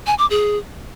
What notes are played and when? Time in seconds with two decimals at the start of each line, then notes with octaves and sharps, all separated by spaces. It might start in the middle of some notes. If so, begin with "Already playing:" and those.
0.07 G#5
0.19 D6
0.30 G#4